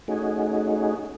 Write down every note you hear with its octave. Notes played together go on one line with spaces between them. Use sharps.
A3 C#4 D#4 F#4 G#4